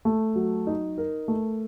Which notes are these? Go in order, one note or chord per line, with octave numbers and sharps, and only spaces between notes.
A3
F#3
D#4
A#4
A3